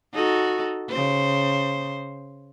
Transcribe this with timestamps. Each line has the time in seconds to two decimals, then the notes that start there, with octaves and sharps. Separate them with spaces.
0.14 D#4 F#4 A4
0.89 C#3 C5